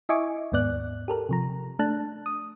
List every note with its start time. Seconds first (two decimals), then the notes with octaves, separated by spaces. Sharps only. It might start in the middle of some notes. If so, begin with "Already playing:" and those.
0.09 E4 D#5 E5 G#5 C#6 D6
0.52 D#2 G#2 B3 D5 F#6
1.08 G4 A4 A#4
1.29 C3 F3 A#5
1.79 A3 D4 A5 F#6
2.26 D#6